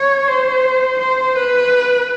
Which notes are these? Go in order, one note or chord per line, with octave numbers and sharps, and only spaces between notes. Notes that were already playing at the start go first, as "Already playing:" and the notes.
Already playing: C#5
C5
C5
B4